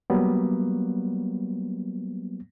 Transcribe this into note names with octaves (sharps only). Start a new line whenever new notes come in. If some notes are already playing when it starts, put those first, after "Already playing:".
F#3 G3 A#3 B3